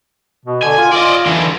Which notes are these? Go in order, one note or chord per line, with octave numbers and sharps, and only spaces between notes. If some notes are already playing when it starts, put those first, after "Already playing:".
B2
D3 G#5
F4
F4 D5 D#5
D3 E3